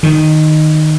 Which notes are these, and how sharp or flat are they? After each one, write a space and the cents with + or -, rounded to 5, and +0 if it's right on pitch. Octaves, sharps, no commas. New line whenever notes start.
D#3 -10